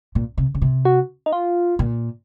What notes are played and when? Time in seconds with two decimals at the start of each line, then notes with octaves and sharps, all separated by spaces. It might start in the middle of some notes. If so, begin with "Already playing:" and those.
0.15 A#2
0.38 C3
0.54 C#3
0.62 C3
0.85 F#4
1.26 D#4
1.33 F4
1.79 A#2